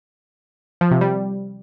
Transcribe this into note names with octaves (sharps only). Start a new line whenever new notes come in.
F3
C3
G3